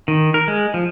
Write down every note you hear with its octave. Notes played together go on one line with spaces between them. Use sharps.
D#3
A#4
G#3
F3